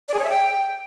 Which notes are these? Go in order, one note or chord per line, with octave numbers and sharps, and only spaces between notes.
D5
G#4
C#5
E5
G5